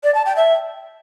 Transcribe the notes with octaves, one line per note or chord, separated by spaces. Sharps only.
D5
A5
G5
E5